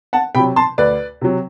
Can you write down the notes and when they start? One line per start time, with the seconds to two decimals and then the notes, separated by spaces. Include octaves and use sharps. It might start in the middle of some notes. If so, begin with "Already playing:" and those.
0.13 F#5 A5
0.35 C3 F#3 G5 B5
0.56 A5 C6
0.78 D2 B4 D5
1.21 C3 F#3